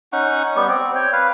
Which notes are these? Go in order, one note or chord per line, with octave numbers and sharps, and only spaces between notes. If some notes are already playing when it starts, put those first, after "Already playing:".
C#4 D#4 F#5 C#6
G3 B3 G4 C#6
C4
C#5 G5
B4 F5